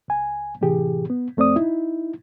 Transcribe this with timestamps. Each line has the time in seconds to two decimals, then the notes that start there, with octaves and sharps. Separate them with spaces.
0.08 C#2 G#5
0.61 A2 C3 E3 G4 G#4
1.10 B3
1.37 F2 A3 C4 D5 D#6
1.56 D#4 E4